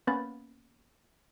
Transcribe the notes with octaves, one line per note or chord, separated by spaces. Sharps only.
A#3 B3 C#4 B4 B5 A6